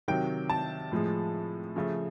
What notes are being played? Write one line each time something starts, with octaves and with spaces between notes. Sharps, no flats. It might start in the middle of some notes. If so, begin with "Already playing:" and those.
C3 D#3 F#3 G5
A5
A2 F3 G#3
C#3 F3 A3